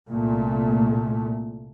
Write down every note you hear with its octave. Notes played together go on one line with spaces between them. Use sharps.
C2 A#2 A3